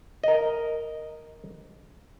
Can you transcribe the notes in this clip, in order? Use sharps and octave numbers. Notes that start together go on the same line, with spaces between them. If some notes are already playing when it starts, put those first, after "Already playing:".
A#4 D#5